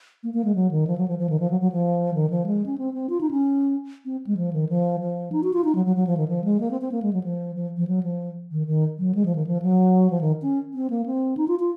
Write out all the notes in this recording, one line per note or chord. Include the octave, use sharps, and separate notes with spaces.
A#3
A#3
G#3
F#3
D#3
F3
F#3
F3
F3
D#3
F3
F#3
F#3
F3
D#3
F3
G#3
C#4
C4
C4
F4
D#4
C#4
C4
G#3
F3
D#3
F3
F3
D#4
F#4
F4
D#4
F#3
F#3
F#3
F3
D#3
F3
G#3
A#3
C4
C4
A#3
G#3
F#3
F3
F3
F3
F#3
F3
D#3
D#3
F#3
G#3
F3
D#3
F3
F#3
F3
D#3
C#4
C4
A#3
C4
D#4
F4
F4